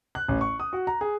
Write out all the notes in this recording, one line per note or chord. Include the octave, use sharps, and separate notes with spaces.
F#6
A1
C#6
D#6
F#4
A#5
G#4